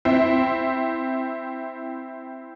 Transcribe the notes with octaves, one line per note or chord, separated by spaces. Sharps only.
C4 E4